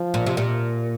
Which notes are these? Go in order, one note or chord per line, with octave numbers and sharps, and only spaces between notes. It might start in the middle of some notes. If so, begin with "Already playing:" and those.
Already playing: F3
A#2
C3
A#2